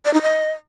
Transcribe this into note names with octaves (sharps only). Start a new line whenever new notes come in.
D5
D#4
D#5